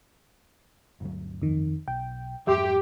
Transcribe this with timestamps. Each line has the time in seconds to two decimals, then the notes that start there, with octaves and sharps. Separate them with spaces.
1.01 G1 D2 F#3
1.42 F2 D#3
1.88 B1 G5
2.47 F2 G#2 F#3 G4 E5 G5 C6